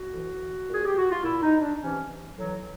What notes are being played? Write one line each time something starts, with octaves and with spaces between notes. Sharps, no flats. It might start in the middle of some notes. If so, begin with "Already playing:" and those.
Already playing: F#4
A2 E3
A#2
G#4
G4
F#4
F4
A#2 E4
D#4
D4
C3 E3 C#4
A2 E3 F#3